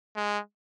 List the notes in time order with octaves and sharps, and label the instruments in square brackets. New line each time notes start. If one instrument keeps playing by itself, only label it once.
[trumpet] G#3